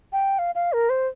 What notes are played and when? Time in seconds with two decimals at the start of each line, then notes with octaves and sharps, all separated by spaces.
0.13 G5
0.39 F5
0.55 F5
0.73 A#4
0.90 C5